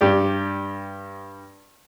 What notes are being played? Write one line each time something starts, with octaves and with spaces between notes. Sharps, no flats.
G2 G4 D5